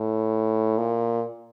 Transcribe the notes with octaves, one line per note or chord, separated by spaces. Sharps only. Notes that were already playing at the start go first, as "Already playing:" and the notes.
Already playing: A2
A#2